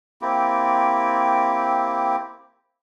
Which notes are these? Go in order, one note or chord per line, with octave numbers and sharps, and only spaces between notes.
A#3 C4 E4 G4